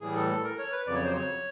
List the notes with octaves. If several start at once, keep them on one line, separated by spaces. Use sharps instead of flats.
A2 E3 G3 G#4
A4
A4
A#4
C#5
B4
F2 C#3 F#3 D5
C#5
C5
C#5